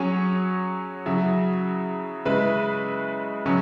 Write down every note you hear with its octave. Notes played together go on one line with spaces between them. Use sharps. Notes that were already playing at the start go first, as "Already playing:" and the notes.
Already playing: F#3 C#4 G#4 C#5
C#3 F#3 E4
C#3 G#3 E4 B4
C#3 F#3 C#4